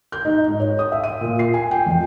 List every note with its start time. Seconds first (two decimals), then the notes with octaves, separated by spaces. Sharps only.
0.12 G6
0.25 D#4
0.48 G#2
0.60 C#5
0.79 D#6
0.92 E5
1.04 D#7
1.21 A#2
1.39 C7
1.54 G#5
1.71 G5
1.86 F2